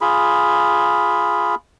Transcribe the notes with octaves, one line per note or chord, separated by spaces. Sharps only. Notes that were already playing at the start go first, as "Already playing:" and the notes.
F4 G#4 B5